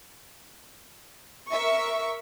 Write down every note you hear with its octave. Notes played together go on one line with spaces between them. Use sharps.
A#4 E5 C#6